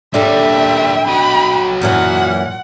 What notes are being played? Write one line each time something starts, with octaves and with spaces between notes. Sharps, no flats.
A#2 G3 D4 A4 E5 G5
F#3 D#5 B5
F#2 A#2 E3 F#5 F6